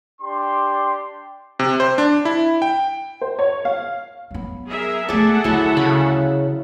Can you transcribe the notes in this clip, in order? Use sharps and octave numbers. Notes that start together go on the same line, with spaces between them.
D4 G4 C6
C3
C5
D4
E4
G5
C5
C#5
F5
F#3 B3
G#4 A#4 E5
A3 B3 G#4 A4 D5 E5 F#5
D2 F#3 E4
C#3 B5